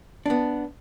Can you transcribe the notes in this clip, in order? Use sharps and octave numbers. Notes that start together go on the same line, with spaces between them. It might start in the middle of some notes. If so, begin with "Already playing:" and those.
B3 D4